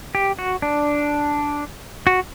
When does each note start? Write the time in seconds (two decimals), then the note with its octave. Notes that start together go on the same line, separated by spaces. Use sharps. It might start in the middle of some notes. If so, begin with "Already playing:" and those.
0.15 G4
0.39 F#4
0.62 D4
2.07 F#4